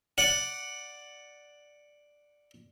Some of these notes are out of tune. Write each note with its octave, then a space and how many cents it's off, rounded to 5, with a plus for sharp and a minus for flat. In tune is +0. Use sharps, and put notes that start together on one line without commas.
D5 +0 F#5 +0